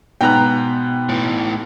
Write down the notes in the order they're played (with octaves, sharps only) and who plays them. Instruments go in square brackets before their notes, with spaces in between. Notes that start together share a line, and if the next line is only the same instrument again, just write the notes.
[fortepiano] G#2 B3 A#5 [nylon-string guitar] B2 [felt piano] G5 F#6
[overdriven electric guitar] A2 E3